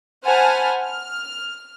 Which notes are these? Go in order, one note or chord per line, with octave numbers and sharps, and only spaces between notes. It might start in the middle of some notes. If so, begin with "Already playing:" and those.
C5 F#5 G#5 A5 B5 F6
F6